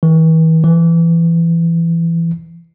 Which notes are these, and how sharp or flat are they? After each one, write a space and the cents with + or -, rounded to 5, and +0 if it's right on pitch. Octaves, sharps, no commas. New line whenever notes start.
E3 -40
E3 +20